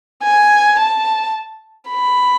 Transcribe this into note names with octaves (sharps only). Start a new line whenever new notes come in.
G#5
A5
B5